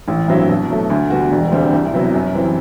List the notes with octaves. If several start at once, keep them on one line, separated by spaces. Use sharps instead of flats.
A1
G2 F#3 C4 E4
B2
F#3 A3
D2
D3 G3 B3 F#4
E1
D2 D3 G3 C4
C2
C3 F#3 B3 E4
F#2
E3 G3 C4 E4